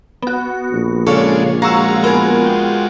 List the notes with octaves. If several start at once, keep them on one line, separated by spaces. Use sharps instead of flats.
B3 F#4
A#1
C#3 G#3 D4 F#4 G#4 A4 C#5 F5
G#3 F4 F#4 F5 A#5 C#6 E6
B3 G#4 A#4
G5